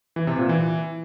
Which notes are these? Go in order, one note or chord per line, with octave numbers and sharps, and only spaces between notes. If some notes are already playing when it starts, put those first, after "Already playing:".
E3
C3
A#2
E3